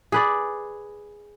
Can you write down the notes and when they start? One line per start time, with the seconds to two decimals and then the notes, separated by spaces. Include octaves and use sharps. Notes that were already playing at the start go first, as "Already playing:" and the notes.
0.12 G#4 B4 D5